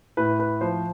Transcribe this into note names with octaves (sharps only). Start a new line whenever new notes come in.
A2 B4
B4
F3 C5